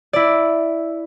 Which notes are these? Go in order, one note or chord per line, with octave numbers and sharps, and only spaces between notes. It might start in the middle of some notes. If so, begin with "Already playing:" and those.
E4 D5